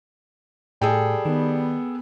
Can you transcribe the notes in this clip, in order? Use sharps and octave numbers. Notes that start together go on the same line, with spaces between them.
A2 G3 G#4 A4 G5
D#3 B3